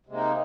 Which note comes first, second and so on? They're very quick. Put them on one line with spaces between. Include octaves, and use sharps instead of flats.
C3 G#3 A#3 D#4